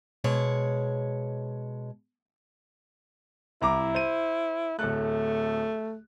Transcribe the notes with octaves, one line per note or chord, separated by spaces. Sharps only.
B2 G#3 C#5
C2 E4 A#5 D6
C5 D#7
D1 A3 A4 F#6